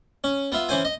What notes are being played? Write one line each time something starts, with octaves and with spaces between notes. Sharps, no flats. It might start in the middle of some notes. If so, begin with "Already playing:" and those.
C#4
B3 F4 E5
E3 C#4 C5 G#5
D#5